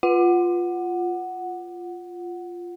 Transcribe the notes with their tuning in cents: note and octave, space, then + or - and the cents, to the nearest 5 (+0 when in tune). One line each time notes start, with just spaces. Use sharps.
F4 +0 F#5 +0